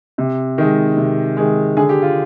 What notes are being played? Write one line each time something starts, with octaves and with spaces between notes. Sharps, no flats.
C3
D#3 G#3
C3
D#3 G#3
D3 G#4
G4
F4